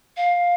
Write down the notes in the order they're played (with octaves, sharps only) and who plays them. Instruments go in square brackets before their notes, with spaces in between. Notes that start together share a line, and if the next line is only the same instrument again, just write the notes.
[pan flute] F5